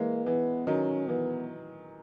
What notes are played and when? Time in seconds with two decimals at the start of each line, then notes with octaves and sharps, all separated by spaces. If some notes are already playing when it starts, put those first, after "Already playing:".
Already playing: E3 G#3 A#3
0.26 E3 B3
0.67 D#3 F#3 C#4
1.08 E3 B3